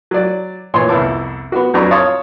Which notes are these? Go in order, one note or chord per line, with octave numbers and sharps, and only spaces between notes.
F#3 D5
A#2 E3 C#5 C6
C2 F2 B3 E4 A5 D6
B3 F#4
F2 F#3 D4 B4 A#5 C#6
C#5 F5 A5 C6 C#6 D#6